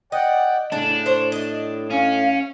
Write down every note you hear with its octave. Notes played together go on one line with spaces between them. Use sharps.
D5 D#5 F#5 G5
A2 C#3 A3 D4
C5 C#5
A3 D#5
C#4 F5